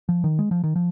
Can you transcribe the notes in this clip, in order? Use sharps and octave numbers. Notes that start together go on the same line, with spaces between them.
F3
D#3
G#3
F3
D#3
F3